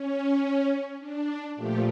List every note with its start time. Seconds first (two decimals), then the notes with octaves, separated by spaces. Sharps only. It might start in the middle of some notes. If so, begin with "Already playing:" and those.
Already playing: C#4
1.00 D4
1.56 A#2 F3 A3 G4